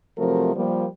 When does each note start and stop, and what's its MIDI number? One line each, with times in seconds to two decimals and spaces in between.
0.18 0.53 48
0.18 0.53 53
0.18 0.53 54
0.18 0.53 57
0.18 0.53 60
0.18 0.53 70
0.55 0.86 53
0.55 0.86 55
0.55 0.86 58